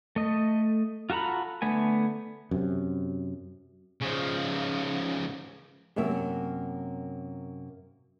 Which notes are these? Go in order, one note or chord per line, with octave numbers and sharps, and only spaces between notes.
A3 D#5
F4 F#4 A4 A#5 B5
D3 A3 B3 G#5
F#2 C3
C#3 F3
F#2 C3 A#3 E5